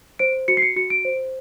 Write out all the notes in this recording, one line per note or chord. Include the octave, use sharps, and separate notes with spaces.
C5 D7
F#4 C#7
C7
C#7
F#4 C#7
D7
C5